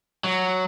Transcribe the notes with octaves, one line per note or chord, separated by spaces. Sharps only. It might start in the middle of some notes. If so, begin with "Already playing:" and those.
F#3